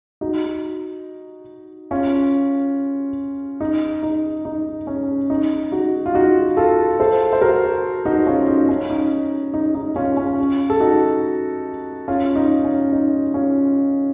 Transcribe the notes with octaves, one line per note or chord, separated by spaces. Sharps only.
D#4 F#4
C#4 F4
D#4
D#4
D#4
C#4
D#4
D#4 F#4
F4
D#4 F#4
F4 A4
A4 C5
C5
F#4 A#4
D#4 F#4
C#4 F4
D#4
C#4
D#4
D#4
D#4
C#4 F4
C#4 F4
A4
D#4 F#4
C#4 F4
D#4
C#4
D#4
C#4 F4